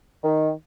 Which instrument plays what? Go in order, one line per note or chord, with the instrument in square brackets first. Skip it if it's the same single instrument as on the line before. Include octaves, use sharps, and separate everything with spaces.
[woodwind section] D#3